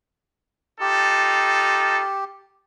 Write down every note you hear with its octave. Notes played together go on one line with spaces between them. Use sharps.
D#4 F4 G4 A4